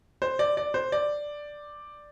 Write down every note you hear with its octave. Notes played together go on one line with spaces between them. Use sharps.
C5
D5
D5
C5
D5